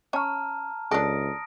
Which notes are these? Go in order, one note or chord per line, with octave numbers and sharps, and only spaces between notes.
C#4 C#5 A5 A#5 F6
C#2 D4 A4 D#6 A#6 D7